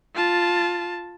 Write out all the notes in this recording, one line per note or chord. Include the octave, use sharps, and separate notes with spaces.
F4 A5